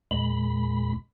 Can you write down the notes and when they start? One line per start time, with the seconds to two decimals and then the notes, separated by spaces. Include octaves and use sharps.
0.11 E2 A#2 G#3 B5